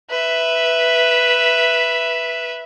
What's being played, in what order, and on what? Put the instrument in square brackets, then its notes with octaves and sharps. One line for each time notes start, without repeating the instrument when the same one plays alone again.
[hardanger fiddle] B4 E5